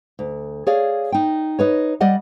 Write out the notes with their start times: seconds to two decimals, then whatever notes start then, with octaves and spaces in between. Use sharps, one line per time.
0.19 D2
0.67 G#4 C#5 D5 F5
1.12 D#4 G5
1.59 D#4 B4 C#5
2.00 G3 D5 D#5 F#5